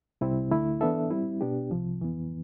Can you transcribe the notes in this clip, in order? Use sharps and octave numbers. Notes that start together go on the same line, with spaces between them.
C2 C3 G3 C4 E4
D2 D3 A3 E4
E3 B3 D4 A4 E5
G3 C4 E4
B2 B3 D4 G4
C2 C3 F3
F2 E3 B3